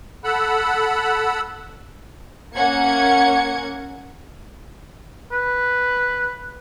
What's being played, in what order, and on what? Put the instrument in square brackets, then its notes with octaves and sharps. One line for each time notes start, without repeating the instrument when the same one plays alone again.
[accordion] A4 F#5 B5 E6 F#6
[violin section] A#3 C#4 F#5 G#6 C#7
[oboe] B4